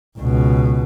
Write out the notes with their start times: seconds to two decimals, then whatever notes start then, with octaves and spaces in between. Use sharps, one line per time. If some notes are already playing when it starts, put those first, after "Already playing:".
0.19 C#2 B2